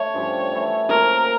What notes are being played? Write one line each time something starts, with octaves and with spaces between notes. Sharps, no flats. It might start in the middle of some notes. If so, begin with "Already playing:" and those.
Already playing: A3 C#5
G2 F3 C#4 G4
E3 A3 E4
F3 A#3 C#4 A#4